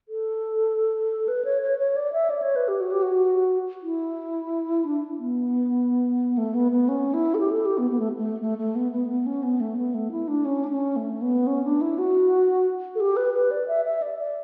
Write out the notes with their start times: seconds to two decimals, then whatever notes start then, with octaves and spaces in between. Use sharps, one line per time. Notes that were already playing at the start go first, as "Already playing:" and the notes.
0.09 A4
1.28 B4
1.45 C#5
1.62 C#5
1.79 C#5
1.96 D5
2.13 E5
2.30 D5
2.42 C#5
2.56 B4
2.68 G4
2.80 F#4
2.92 G4
3.02 F#4
3.83 E4
4.85 D4
5.18 B3
6.37 A3
6.54 B3
6.71 B3
6.88 C#4
7.14 E4
7.34 A4
7.39 G4
7.52 A4
7.65 G4
7.78 B3
7.90 B3
7.99 A3
8.18 A3
8.41 A3
8.58 A3
8.75 B3
8.92 B3
9.09 B3
9.26 C#4
9.43 B3
9.60 A3
9.77 B3
9.94 A3
10.11 E4
10.28 D4
10.45 C#4
10.64 D4
10.71 C#4
10.96 A3
11.22 B3
11.47 C#4
11.64 D4
11.81 E4
11.98 F#4
12.95 A4
13.00 G4
13.16 B4
13.34 B4
13.51 D5
13.68 E5
13.85 E5
14.02 D5
14.19 D5